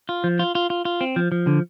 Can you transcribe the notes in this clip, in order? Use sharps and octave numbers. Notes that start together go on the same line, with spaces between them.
F4
F3
F4
F4
F4
F4
C4
F3
F3
D3